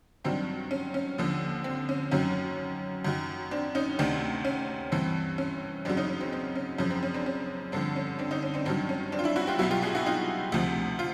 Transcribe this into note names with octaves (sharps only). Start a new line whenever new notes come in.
G2 D#3 F#3 C4 D4
C#4
C#4
D#2 D3 F3
C4
C#4
F#2 D#3 F#3 C#4
F#2 D#3 F#3
C4 D4
C#4 D#4
D2 C3 D#3 C4 D4
C#4
G2 E3 C4
C#4
F#2 C#3 F#3 C4 D4
C#4 D#4
C#4
C4
C4
C#4
F#2 C#3 F3 C#4
C4
C#4
C4 D4
C#4
G2 D3 F3 C4
C#4
C4 D4
C#4 D#4
C#4
C4 D4
G2 D#3 F#3 C4 D4
C#4
C4 D4
F4
D4 E4
E4 F#4
F4 G4
C2 B2 F#3 E4 F#4
F4 G4
F#4 G#4
E4 F#4
D#4 F4
D2 C3 F3
F4